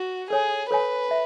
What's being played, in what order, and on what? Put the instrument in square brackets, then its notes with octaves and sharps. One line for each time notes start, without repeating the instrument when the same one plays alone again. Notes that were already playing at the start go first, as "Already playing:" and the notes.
Already playing: [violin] F#4
[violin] G#4 [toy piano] A4 C#5 G#5
[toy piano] A4 C#5 G#5 [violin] B4
[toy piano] E5